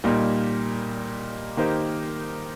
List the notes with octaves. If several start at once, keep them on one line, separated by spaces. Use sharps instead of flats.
A#2 G3 A#3 D#4
D#3 A#3 D#4 G4 C5